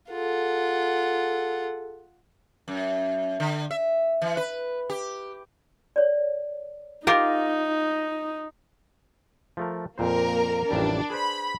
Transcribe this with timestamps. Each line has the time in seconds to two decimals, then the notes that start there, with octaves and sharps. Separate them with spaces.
0.10 F4 G#4 A4 F#5
2.68 F#2
3.40 D3
3.71 E5
4.22 E3
4.37 B4
4.90 G4
5.96 C#5 D5
7.07 D#4 F4 G4 A#4
9.57 F3 A3 A#4
9.98 F2 A#2 A#3 A#4 C5
10.71 A1 F2 G3 D4
11.10 G#4 B4 C5 B5